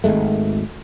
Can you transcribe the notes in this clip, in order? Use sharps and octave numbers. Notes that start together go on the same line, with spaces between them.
G#1 E2 G#3 A3